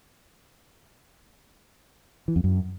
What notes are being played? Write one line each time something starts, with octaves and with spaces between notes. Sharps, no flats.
E3
F2
F#2